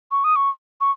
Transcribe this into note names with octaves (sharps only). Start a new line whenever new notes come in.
C#6
D#6
C#6
C#6